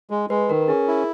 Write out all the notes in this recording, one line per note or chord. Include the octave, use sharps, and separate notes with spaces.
G#3
G#3 B4
D#3 A#4
A#4
C#4 G#4
E4